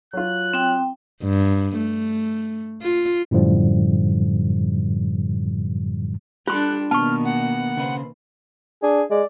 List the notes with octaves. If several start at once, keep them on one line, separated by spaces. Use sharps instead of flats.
F#3 F4 F#6
C4 G5
G2
A3
F4
F#2 A2 D3 F3 G3
G3 D4 F4 G4 A4 C6 F#6
B2 D#3 A#3 B3 A5 C#6 F6
F#5
C#3 B4 C5
D4 G#4
G#3 D5